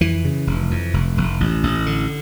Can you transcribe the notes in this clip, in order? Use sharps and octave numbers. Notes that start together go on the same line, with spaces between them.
F2 E3
C#3
F1
F2
F1
F1
A1
A1
D3